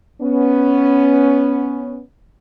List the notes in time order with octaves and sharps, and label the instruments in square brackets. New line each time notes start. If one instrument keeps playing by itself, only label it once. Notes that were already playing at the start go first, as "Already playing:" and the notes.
[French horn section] B3 C#4